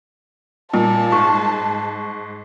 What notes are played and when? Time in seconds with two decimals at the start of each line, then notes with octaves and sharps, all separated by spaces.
0.73 A#2 G3 A5
1.12 G#2 C#6